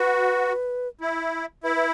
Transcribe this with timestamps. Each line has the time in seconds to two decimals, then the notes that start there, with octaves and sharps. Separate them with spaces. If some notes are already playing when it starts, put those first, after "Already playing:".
Already playing: F#4 B4
1.01 E4
1.64 E4 B4
1.76 B4